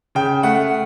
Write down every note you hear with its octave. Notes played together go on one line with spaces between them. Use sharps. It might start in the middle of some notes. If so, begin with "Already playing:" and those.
C#3 G5
A3 F#5